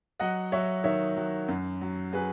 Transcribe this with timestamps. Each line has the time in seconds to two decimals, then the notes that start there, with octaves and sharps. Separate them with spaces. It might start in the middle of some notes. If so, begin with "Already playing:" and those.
0.20 F#3 D#5 F#5
0.52 F#3 C#5 E5
0.84 D#3 C#5 E5
1.17 F#3
1.48 F#2
1.81 F#3
2.13 F#3 G#4 B4